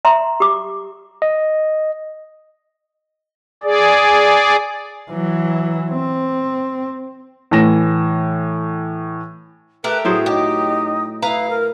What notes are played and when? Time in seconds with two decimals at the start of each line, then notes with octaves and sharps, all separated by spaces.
0.05 E5 A#5 C6
0.40 G4 D6
1.22 D#5
3.63 G#4 D5
5.10 E3 F#3
5.92 C4
7.51 A2 E3 A#6 E7
9.84 A3 G4 A#4 B4
10.05 A2 F#3 G#4 C5
10.26 D#4 G4
11.22 E4 B4 F5 A#5
11.50 A#4